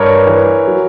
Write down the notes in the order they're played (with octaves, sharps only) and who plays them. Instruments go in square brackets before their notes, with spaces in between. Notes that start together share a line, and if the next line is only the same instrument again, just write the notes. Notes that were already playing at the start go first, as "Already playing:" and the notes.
Already playing: [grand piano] G2 A#4 C#5
E3
F#3